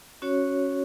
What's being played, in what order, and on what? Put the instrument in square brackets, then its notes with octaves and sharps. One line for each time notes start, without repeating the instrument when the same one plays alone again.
[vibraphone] C#4 F#4 C#5